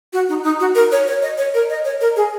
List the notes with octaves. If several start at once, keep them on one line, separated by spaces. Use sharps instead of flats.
F#4
D#4
D#4
F#4
A#4
C#5
C#5
D#5
C#5
A#4
D#5
C#5
A#4
G#4